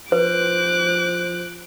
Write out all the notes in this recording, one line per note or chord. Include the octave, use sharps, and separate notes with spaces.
F3 B4 C5 D6 F#6